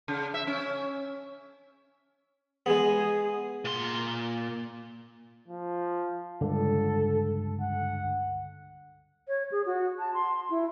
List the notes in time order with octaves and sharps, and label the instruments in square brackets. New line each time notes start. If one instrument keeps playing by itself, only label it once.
[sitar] C#3
E5
C#4
[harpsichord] G#3 B3 [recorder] G#4
[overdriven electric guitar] A#2 C6
[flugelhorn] F3
[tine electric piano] C#2 G2 D3 [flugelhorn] A4
[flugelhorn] F#5
[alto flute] C#5
G#4
F#4
A5
C6
E4